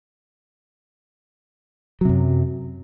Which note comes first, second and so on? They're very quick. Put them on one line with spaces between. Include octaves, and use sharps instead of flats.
F#3 C3 F#2